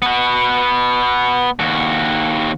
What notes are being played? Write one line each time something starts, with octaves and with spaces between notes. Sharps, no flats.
B3 F#4
D#2 F#4